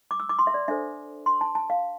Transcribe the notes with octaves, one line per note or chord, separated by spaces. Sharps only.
D6
E6
D6
C6
E5
D5
D4 A4 C5 E5
C6
A5
A5
F5